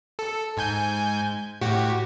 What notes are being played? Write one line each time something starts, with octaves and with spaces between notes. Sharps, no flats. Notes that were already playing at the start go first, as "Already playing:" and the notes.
A4
G#2 G#5 G6
A2 F#4 G4